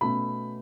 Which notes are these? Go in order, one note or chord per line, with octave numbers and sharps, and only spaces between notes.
B2 A3 C#4 B5